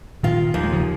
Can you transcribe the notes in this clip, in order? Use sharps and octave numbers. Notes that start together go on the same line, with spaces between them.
A#2 D#3 F4
D#2 F3
G#3
C#3 F3